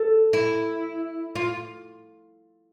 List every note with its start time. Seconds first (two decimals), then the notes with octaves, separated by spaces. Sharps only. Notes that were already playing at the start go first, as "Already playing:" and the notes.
Already playing: A4
0.33 E4
1.35 F4